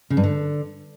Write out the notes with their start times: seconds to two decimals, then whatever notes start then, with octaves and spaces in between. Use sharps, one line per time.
0.10 C#3
0.17 G2
0.24 D3